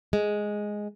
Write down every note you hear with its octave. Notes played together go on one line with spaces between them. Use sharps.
G#3